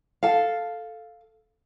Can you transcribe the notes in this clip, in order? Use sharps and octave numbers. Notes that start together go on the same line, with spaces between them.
A4 F5